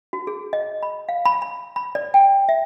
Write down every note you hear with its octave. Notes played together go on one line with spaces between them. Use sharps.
F#4
G#4
D#5
B5
F5
B5
B5
B5
D5
G5
E5